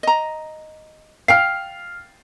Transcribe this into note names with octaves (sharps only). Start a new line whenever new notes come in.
D#5 A#5
F5 G5 F6 C7